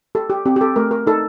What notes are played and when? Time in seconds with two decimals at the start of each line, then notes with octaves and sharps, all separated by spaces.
0.15 G4 A4
0.30 G4
0.46 C4 G4
0.56 G4
0.61 A4
0.76 A3 A#4
0.91 A#4
1.07 D#4 A4